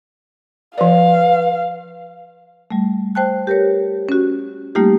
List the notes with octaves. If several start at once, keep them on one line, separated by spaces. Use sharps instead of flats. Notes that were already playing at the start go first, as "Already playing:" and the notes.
F3 B4 D5 F5
G3 A3
C5 G5 A5 F#6
G4 A#4 B4 C#5
C#4 F#4
G3 A3 A#3 D#4 F4 G4